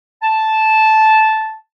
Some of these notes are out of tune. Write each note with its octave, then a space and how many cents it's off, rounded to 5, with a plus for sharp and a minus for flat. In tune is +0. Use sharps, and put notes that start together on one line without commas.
A5 -10